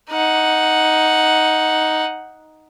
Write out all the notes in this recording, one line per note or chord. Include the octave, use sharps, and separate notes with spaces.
D#4 F#5